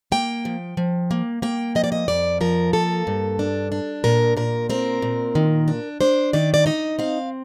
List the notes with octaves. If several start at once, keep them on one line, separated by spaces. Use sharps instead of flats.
A#3 G5
F3
F3
A#3
A#3 G5
F3 D#5
D5
D#5
F2 D5
F3 A#4
A#3 A4
G2
D4
D4
A#2 A#4
A#2 A#4
C4 A#4
A#2
D#3
D4
D4 C5
D#3 D5
D5
D#4 D#5
C4 F5